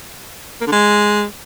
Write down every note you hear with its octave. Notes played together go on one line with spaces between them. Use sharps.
A#3
D3
G#3